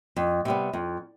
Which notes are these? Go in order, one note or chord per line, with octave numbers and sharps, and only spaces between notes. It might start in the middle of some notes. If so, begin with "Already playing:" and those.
F2
C3 G3 B3
F2